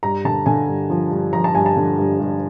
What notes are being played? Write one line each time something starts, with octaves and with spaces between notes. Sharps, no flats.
G2 A#5
D3 A5
D3 G#5
G2
F3
G2
F3 A#5
A5
G2 G#5
A5
D3
G2
G2